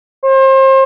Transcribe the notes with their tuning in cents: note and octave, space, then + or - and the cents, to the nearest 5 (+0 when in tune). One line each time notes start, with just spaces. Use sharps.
C5 +35